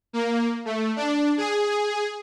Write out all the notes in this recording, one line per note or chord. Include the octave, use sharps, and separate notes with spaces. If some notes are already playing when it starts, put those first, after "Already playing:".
A#3
A3
D4
G#4